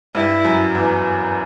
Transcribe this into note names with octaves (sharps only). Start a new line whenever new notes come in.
G2 G3 E4
F#2 F#3
E2 E3